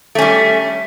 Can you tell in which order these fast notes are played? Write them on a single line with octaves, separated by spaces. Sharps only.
A3 C#4 G3